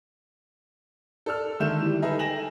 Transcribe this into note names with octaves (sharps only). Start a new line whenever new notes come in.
A4 D5 E6 F6
D3 D#3 G#3 E5 G6 E7
E3 G3
D#4 G#4 A4 B4 D#5 E5
G5 G#5 A#6 E7 F#7